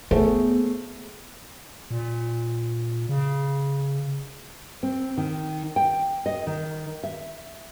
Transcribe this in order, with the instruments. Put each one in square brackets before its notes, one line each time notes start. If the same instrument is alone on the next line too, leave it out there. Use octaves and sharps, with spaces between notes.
[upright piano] A3 G#4 C5 [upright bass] B3
[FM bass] A#2
C#3
[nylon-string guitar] C4
D#3
G5
D#5
D#3
E5